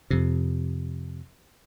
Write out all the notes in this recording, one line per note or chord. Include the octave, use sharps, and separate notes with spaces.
F2 C3